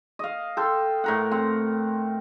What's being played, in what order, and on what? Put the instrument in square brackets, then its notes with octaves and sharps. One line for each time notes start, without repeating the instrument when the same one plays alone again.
[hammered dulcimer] D#5 F5
A4 G5 C6
A2 A#4 F#5
C4 F#5